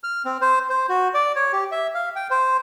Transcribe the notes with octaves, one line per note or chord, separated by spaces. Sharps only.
F6
C4
C5
C5
F#4
D5
C#5
G4
E5
F5
G5
C5